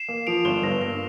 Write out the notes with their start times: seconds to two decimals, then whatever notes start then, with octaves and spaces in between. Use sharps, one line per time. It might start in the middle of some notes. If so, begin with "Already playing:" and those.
Already playing: C7 E7
0.08 A#3
0.27 F3 D7 F7
0.45 G1 E7 G7
0.63 G2 A#6
0.81 A#3 A#6